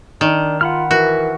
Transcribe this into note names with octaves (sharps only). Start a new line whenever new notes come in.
D#3 D4
F4 F#5 B5 F6
E3 F#4 A#4